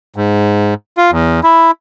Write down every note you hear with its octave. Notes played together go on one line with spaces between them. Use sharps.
G#2
F4
E2
E4